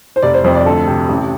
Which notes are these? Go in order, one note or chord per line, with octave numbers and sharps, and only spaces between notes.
C5
F1 D5
C5
F2 C5
D5
D2 A4
C3
A1